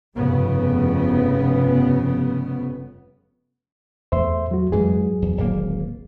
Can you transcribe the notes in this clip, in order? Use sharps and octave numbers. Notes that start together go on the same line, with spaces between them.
F1 G2 C#3 B3
E2 A3 C5 E5 C6
F#3 F#4
F2 G#2 E3 F#3 G#4
E2
D1 G#1 A#3